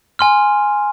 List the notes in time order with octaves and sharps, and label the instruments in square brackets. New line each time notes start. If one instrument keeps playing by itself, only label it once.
[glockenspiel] G#5 C6 F6